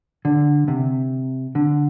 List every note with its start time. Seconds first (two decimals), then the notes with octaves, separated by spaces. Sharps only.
0.25 D3
0.68 C3
1.55 D3